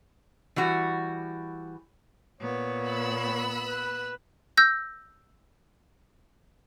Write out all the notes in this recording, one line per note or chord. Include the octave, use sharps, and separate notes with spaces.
E3 G3 F#4
A#2 B3 C#5
B5 E6 F#6
B4
E6 G6 A#6